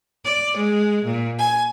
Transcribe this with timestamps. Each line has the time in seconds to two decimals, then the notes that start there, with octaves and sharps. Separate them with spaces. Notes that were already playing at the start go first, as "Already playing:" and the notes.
0.24 D5
0.56 G#3
1.04 A#2
1.38 G#5